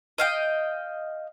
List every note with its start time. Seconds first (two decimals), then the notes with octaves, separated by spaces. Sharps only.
0.18 D#5 F5 G5